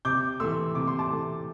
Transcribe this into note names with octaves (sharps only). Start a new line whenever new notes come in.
C3 D6 G6
E3 A3 C6 E6
C3 D6
C6
A5 D6
E3 A3